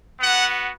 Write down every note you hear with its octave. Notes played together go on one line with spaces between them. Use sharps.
B3 F#4 F#5